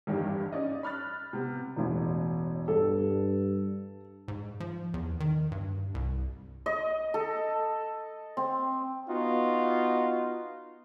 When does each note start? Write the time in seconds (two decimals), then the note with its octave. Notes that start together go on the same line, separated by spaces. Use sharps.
0.07 G#1 E2 G2 D#3 G3
0.52 C#4 D5 D#5
0.83 B5 F6 F#6 A6
1.33 C3 B3
1.77 E1 A1
2.68 G2 A4
4.28 G#2
4.60 F3
4.94 E2
5.20 D#3
5.52 G2
5.94 C2
6.66 D#5
7.14 A4
8.37 C4
9.08 B3 D#4 F4 F#4